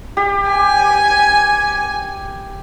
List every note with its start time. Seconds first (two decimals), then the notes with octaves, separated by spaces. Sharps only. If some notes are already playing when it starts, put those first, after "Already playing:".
0.17 G4
0.49 G#5